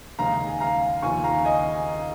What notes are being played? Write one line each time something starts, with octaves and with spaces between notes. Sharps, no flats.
D#2 C#3 G#3 F5 A#5
F5
G#5
F5 A#5
D#2 C#3 F3 G#5 C#6
F5 A#5
D#5 G#5